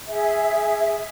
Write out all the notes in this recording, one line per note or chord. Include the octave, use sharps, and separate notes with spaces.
G#4 E5